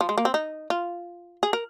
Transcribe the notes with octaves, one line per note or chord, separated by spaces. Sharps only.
F3
G#3
A#3
C4
D#4
F4
G#4
A#4